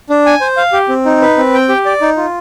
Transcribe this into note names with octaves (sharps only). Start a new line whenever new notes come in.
D4
G#5
C5
F5
G4
C4
D#4
B4
C4
G5
G4
D5
D#4
F4